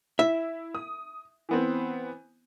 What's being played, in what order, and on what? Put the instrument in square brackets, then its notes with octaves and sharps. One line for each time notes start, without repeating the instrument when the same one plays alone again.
[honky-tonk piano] E4 [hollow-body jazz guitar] E5
[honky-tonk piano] D#6
E3 B3 C4